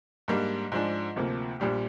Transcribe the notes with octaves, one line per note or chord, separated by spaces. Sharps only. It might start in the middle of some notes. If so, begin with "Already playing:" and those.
G#2 G3 A#3 D4
G#2 F3 G#3 D4
D2 C3 F3 A#3
A#1 A#2 G3 D4 G4